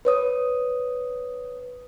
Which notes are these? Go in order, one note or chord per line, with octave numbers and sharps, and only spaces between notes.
B4 C#5 D#6